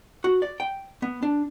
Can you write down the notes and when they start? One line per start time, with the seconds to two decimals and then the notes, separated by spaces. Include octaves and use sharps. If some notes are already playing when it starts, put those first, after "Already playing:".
0.24 F#4
0.42 D5
0.60 G5
1.02 B3
1.23 D4